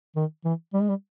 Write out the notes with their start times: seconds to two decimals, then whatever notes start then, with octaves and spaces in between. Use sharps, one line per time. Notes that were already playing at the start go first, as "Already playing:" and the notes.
0.16 D#3
0.45 E3
0.74 G3
0.81 G#3
0.89 G3